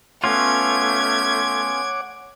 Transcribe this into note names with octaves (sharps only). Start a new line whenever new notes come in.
A3 B3 C#4 F4 C#5 F#5 D6 G#6